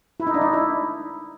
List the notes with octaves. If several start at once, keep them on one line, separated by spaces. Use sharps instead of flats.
E4
D#4
D4
D#4
E4